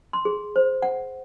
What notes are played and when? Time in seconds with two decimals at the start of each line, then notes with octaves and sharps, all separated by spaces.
0.13 C6
0.25 G#4
0.56 C5
0.82 F#5